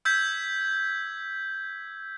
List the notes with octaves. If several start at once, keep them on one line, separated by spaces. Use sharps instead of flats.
E6 G6 G#6 B6